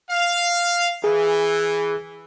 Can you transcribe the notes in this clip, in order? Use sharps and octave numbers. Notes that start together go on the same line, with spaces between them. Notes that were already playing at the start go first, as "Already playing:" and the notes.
F5
E3 G#4